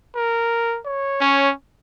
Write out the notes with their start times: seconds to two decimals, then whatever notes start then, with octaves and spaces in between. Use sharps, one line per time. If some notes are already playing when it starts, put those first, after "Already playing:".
0.15 A#4
0.85 C#5
1.21 C#4